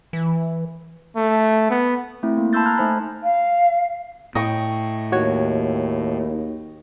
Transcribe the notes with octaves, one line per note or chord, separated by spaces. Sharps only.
E3
A3
B3
A3 C4 E4
A#3
A5 B5 C6 E6 G6 A6
A5 A#5 F6 F#6 G#6
A3 D#4 C5 G#5 B5
F5
A2 D#5 G5 C#6
D#2 F#4 C#5 G#6